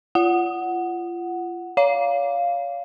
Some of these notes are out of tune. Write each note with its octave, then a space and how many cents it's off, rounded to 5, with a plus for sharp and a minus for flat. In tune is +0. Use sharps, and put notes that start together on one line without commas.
F4 -30 F#5 +0
C#5 +35 F5 +0